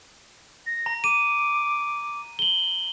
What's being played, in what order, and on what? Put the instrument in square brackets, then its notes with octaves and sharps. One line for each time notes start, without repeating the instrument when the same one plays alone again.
[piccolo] A#6
[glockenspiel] A#5
[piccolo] D6 [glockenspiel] D#7
[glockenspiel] F#7 G7